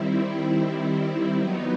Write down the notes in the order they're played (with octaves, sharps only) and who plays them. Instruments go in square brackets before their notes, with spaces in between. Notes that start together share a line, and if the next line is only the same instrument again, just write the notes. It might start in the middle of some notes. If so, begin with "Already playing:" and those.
Already playing: [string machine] D#3 G3 C4 E4
F#3 B3 D#4